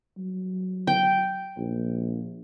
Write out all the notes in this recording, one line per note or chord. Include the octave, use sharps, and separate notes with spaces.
F#3
G5
A#1